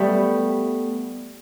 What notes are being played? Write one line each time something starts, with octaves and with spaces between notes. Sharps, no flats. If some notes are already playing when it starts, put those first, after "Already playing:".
Already playing: G3 A3 B3